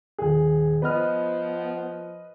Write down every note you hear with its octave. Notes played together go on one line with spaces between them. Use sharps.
D#1 G#4
F3 B3 B4 D#5 F6